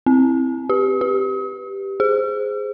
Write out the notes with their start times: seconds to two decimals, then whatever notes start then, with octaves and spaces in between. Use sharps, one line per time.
0.06 C4
0.70 G4
1.01 G4
2.00 G#4